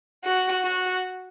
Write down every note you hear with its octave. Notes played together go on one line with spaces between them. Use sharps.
F#4
F#4